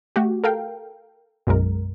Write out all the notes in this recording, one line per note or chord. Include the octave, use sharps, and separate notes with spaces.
A3 F#4 G4
A4 A#4 F5 G5
B1 F#2 G#3 A#4